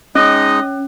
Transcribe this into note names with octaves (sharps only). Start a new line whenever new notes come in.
G#3 C#4 D#4 D#5